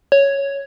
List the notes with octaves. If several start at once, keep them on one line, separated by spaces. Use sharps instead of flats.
C#5